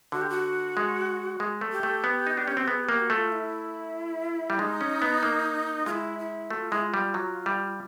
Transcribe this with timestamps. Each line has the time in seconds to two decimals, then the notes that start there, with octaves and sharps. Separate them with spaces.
0.12 D3 F#4
0.21 G4
0.30 F#4
0.77 G#3
1.40 G#3
1.61 A3
1.72 G4
1.83 A3
2.04 B3
2.27 D#4
2.37 D4
2.48 C#4
2.57 C4
2.67 B3 G#4
2.83 G4
2.89 A#3
3.00 F#4
3.10 A3
3.16 F4
3.32 E4
4.50 G3
4.59 G#3 D#4
4.81 C#4
5.02 B3
5.23 A#3
5.86 G#3 E4 F4
6.19 E4
6.50 A3 F#4
6.61 F4
6.71 G#3 E4
6.82 F4
6.94 G3
7.14 F#3
7.46 G3